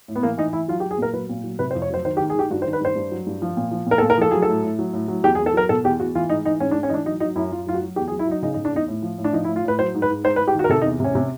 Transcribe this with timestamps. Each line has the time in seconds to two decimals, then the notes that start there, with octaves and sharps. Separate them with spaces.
0.08 A2
0.15 B3
0.23 E3 A#3
0.38 E3 D#4
0.53 E3 E4
0.68 F#3 F4
0.80 G4
0.83 F#3
0.91 G#4
0.98 A#2 A#4
1.13 F#3 B4
1.29 A#2
1.44 F#3
1.59 C3 B4
1.71 C5
1.75 F2
1.82 C#5
1.90 F#3 C5
2.05 D#3 C5
2.17 G4
2.20 D#3
2.30 G#4
2.35 D#3 G4
2.50 G2 F#4
2.62 C5
2.66 D#3
2.73 B4
2.80 G2 C5
2.95 G2
3.11 F#3
3.26 G2
3.42 F3
3.57 A#2
3.71 F3
3.87 A#2 A#4
3.98 A4
4.02 A#2
4.10 A#4
4.18 F3 A4
4.31 F#3 G#4
4.42 A4
4.48 A2
4.64 A2
4.79 F#3
4.93 A2
5.08 F#3
5.23 E2 G4
5.35 G#4
5.38 E2
5.46 A4
5.54 F#3 A#4
5.69 B2 A4
5.84 E2 G4
5.99 E2 F#4
6.15 E3 F4
6.29 G#2 D#4
6.45 E3 D#4
6.60 G#2 C#4
6.71 D4
6.75 G#2
6.83 C#4
6.89 E3 D4 D#4
7.06 F#3 D#4
7.20 F#3 D#4
7.36 F#2 E4
7.52 F#2 F4
7.67 F#3 F4
7.74 F#4
7.82 F#3
7.96 E2 G4
8.08 G#4
8.12 F#3
8.19 E4
8.27 F#3 D#4
8.42 C#3 D#4
8.54 D#4
8.57 C#3
8.65 D4
8.73 E2 D#4
8.88 A2
9.02 F3
9.18 A2
9.24 D4
9.33 F3 D#4
9.44 E4
9.49 A2
9.56 F4
9.64 A2 B4
9.79 F#3 C5
9.94 G#2
10.02 B4
10.10 G#2
10.24 G#2 C5
10.36 B4
10.39 G#2
10.48 G4
10.55 D#3 F#4
10.64 A#4
10.69 C3 A4
10.81 D#4
10.85 E2
11.00 C3 C#4
11.15 C3